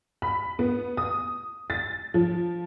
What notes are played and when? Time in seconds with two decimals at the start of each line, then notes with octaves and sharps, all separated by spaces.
0.22 B5
0.59 B3
0.97 D#6
1.70 A6
2.14 F3